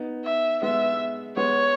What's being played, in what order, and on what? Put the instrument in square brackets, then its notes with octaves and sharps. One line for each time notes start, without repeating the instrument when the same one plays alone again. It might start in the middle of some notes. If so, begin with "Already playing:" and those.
Already playing: [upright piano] B3 D#4
[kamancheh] E5
[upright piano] G#3 B3 [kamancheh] E5
[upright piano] G#3 B3 [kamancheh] C#5